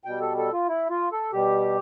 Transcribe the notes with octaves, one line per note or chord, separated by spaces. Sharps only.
B2 G3 G5
A4
A4
F4
E4
F4
A4
B2 G3 G4